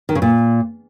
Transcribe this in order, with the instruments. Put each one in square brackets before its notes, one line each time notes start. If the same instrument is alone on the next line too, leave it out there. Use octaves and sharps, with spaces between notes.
[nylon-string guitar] D#3
C#3
A#2